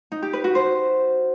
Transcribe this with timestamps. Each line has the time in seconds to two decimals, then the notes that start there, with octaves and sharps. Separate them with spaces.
0.12 D#4
0.22 G4
0.33 B4
0.44 F#4
0.55 C5